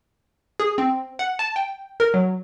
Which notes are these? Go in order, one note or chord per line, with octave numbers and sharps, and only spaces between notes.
G#4
C4
F#5
A5
G5
A#4
F#3